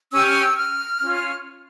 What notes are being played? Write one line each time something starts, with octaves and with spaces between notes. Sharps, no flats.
C#4 G4 C#5 E6
F6
E6
F6
C#4 F4 C#5